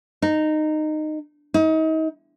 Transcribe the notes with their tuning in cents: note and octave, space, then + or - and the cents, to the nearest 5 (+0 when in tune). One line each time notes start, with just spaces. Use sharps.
D#4 -15
D#4 +35